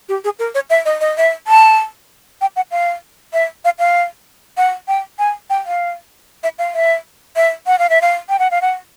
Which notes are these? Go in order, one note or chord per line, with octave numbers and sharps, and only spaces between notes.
G4
G#4
A#4
C#5
E5
D#5
D#5
E5
A5
G5
F#5
F5
E5
F5
F5
F#5
G5
G#5
G5
F5
E5
F5
E5
E5
F#5
F5
E5
F5
G5
F#5
F5
F#5